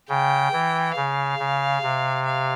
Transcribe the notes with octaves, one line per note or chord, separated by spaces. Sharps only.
C#3 G5
E3
C#3 F5
C#3
C3
F5